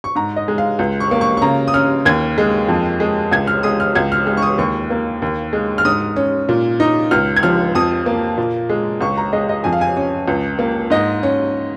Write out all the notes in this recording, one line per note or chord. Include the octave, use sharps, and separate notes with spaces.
C#6
G#2 A#5
D#5
G#3
F5
C#2
C#6
A#3
C#6
C#6
C#3 A#5
D#6
C#4 F6
D#2 G#6
G#3
F2
G#3
C#2 G#6
F6
G#3 D#6
F6
C#2 G#6
F6
G#3 F6
C#6
D#6
D#2 C#6
A#3
D#2
G#3
F6
G#2 D#6
C#4
A#2
D#4
C#2 F6
G#6
F3 F6
F2 D#6
A#3
A#2
G#3
C#2 C#6
A#5
G#3 D#5
D#5
F2 G#5
F5
G#5
C#4
C#2
A#3
G#2 D#5
C#4